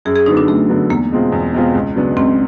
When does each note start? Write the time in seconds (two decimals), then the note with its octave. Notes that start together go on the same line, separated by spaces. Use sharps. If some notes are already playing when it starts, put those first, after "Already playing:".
0.05 F#2 G#4
0.16 G#4
0.26 D3 F#3 B3 D#4
0.37 D4
0.47 F#2 A3
0.69 D3 F#3 B3
0.90 E2 A#3
1.11 B2 G#3 C4 F4
1.32 E2
1.54 B2 G#3 C4 F4
1.74 C#2
1.96 C#3 F#3 B3 D4
2.17 C#2 C4